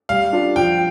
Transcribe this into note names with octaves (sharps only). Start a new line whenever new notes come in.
G3 F5
D4 F4
F3 G5